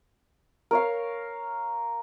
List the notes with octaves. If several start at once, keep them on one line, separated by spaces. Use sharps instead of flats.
A#4 C#5 F5